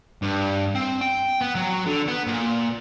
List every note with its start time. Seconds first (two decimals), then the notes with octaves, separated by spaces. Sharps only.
0.22 G2
0.75 C4
1.01 G5
1.41 B3
1.55 F#3
1.86 D3
2.07 B3
2.27 A#2